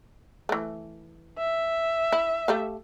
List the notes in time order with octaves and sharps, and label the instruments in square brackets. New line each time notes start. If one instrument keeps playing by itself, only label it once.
[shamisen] E3 A3
[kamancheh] E5
[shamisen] E4
A3 G4 F5